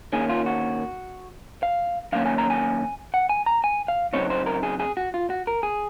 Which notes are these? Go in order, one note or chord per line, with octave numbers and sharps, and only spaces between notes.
D#3 A#3 C#4 G#4
F4
F#4
F5
F#2 D#3 A#3 C#4 F5
G#5
A#5
G#5
F#5
G#5
A#5
G#5
F5
C#3 F#3 C4 D#4 C#5
C5
A#4
G#4
G#4
F#4
F4
F#4
A#4
G#4